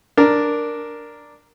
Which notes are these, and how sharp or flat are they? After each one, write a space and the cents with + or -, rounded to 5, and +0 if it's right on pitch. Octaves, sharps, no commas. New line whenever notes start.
D4 +0 A#4 +0